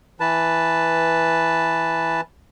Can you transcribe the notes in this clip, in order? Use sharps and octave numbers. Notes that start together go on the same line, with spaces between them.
E3 B4 A5